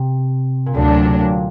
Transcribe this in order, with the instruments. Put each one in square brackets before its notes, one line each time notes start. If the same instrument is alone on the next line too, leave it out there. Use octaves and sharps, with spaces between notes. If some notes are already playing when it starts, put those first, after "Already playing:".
Already playing: [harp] C3
A#2
[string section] D2 D3 F#3 A3 D4 [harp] A2
[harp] A#2
C3
A#2